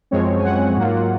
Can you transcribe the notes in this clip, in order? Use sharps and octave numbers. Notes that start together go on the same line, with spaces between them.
F#2 F3 G#3 C4 C#5
G#5
F#5
G#2 F#3 A#3 F4